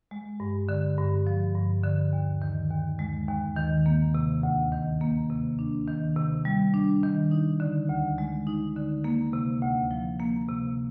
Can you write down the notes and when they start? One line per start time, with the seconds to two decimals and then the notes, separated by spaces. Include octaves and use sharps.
0.11 G#3
0.40 G2
0.69 D3
0.97 G2
1.27 F3
1.55 G2
1.84 D3
2.13 D#2
2.42 D#3
2.70 D#2
2.99 G#3
3.28 D#2
3.57 D#3
3.86 A#3
4.15 C3
4.43 D2
4.72 D#3
5.01 A#3
5.30 C3
5.59 D4
5.88 D#3
6.16 C3
6.45 G3
6.74 D4
7.03 D#3
7.31 D#4
7.60 D3
7.89 D2
8.18 G#3
8.47 D#4
8.76 D3
9.04 A#3
9.33 C3
9.62 D2
9.91 F3
10.20 A#3
10.48 C3